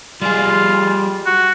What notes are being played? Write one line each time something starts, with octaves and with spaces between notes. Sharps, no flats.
G3 F4 G#4
F#4